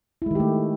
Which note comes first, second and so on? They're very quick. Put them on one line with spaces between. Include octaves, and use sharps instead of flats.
E4 G#3 D#3 G4 A3